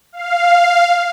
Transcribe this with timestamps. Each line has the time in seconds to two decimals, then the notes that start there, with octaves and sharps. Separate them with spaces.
0.13 F5